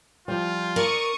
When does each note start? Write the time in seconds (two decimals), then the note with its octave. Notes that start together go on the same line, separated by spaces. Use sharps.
0.28 F3 G3 F4
0.76 A#4 D5 C#6 D#6